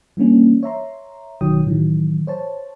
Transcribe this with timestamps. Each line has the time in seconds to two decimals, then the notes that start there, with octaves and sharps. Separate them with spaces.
0.17 E3 G3 A#3 C#4 D4
0.63 C#5 E5 A#5 C6
1.41 B1 D#3 F#3 C#5 G5 D#6
1.66 A2 D#3 E3 F#3
2.27 C5 C#5 A5